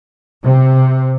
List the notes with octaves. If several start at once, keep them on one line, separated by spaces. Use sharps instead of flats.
C3